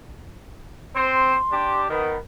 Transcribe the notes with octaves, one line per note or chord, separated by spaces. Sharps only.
C4 C5 C6
D4 G4
D#3 B3